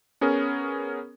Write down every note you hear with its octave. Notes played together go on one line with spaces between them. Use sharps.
B3 C#4 G#4 A#4